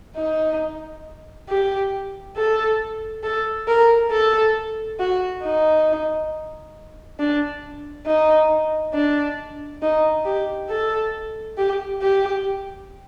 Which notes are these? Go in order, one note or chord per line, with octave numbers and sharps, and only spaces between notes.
D#4
G4
A4
A4
A#4
A4
F#4
D#4
D4
D#4
D4
D#4
G4
A4
G4
G4